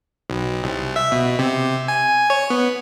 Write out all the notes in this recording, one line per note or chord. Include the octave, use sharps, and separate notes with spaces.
B1
C2
E5
B2
C3
G#5
C#5
B3